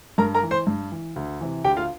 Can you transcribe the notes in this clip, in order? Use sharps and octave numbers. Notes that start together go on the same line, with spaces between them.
G2 A#4 A#5
A#4 A#5
E3
C5 C6
G2
E3
D2
C3 E3
D2 G4 G5
F4 F5